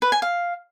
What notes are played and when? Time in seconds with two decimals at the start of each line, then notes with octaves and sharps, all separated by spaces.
0.02 B4
0.12 G#5
0.22 F5